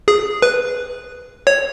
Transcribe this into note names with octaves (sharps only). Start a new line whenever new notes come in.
G#4
B4
C#5